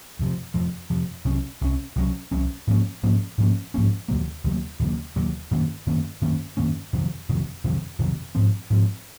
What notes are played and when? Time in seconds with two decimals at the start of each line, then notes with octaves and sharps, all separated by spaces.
0.19 F2 C3 F3
0.54 F2 C3 F3
0.90 F2 C3 F3
1.25 C2 C3 F#3 C#4
1.61 C2 C3 F#3 C#4
1.96 C2 C3 F#3 C#4
2.31 C2 C3 F#3 C#4
2.67 G#2 F3 A#3 C#4
3.03 G#2 F3 A#3 C#4
3.38 G#2 F3 A#3 C#4
3.74 G#2 F3 A#3 C#4
4.08 D#2 C#3 F#3 A#3
4.44 D#2 C#3 F#3 A#3
4.79 D#2 C#3 F#3 A#3
5.16 D#2 C#3 F#3 A#3
5.51 F#2 D#3 A#3 C#4
5.87 F#2 D#3 A#3 C#4
6.22 F#2 D#3 A#3 C#4
6.57 F#2 D#3 A#3 C#4
6.93 F2 C3 D#3 F#3
7.29 F2 C3 D#3 F#3
7.64 F2 C3 D#3 F#3
7.99 F2 C3 D#3 F#3
8.35 G#2 F3 C4
8.70 G#2 F3 C4